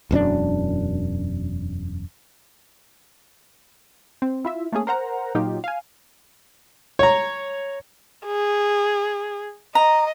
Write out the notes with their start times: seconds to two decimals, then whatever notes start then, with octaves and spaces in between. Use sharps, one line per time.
0.11 E1 F#2 C#4 D4
4.22 C4
4.45 E4 F4 E5
4.72 A3 A#3 C#4 G#4
4.87 A#4 C5 F#5 A#5
5.35 A#2 F#3 D#4 F4 G4
5.64 F5 G#5
6.99 C#5 A#5
8.26 G#4
9.75 D#5 A#5